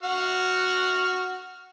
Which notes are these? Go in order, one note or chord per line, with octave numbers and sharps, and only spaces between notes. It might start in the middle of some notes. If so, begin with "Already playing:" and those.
F#4 F#5 F6